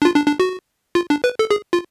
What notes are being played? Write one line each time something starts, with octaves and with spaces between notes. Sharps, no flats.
D4
F4
D4
D4
F#4
F4
D4
B4
A4
G#4
F4